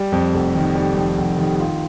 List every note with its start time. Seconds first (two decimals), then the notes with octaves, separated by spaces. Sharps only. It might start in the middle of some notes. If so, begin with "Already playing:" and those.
Already playing: G3
0.12 F2
0.34 F1
0.55 D#3
0.75 G3
0.96 F2
1.18 F1
1.38 D#3
1.59 F4